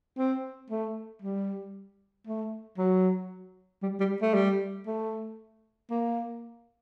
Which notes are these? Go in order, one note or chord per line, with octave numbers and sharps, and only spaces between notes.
C4
A3
G3
A3
F#3
G3
G3
A3
G3
A3
A#3